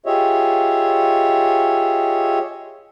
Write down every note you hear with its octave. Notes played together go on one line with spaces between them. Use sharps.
F4 G4 G#4 C#5 D#5 E5